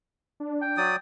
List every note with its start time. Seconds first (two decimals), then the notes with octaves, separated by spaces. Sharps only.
0.40 D4
0.62 G5
0.77 F#3 D5 D#6